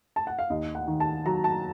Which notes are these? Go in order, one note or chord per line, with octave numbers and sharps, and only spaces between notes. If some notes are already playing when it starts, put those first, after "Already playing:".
A5
F#5
F5
D#2 D#5
F#5
D#3
A5
F#3 A#5
A5